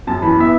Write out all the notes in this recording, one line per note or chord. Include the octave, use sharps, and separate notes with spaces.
F#2 A5
E3 B5
B3 E5